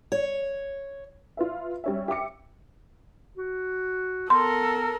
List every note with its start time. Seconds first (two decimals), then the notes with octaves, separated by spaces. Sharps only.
0.12 C#5
1.37 F4 B4 E5
1.84 G3 C#4 E5
2.08 G4 E5 D6 C#7
3.38 F#4
4.30 B3 A4 A#4 C6